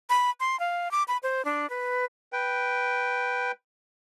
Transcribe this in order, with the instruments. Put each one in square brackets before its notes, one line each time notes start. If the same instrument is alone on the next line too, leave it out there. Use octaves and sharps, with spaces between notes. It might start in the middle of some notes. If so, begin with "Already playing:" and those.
[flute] B5
C6
F5
D6
B5
C5
D4
B4
[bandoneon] B4 G5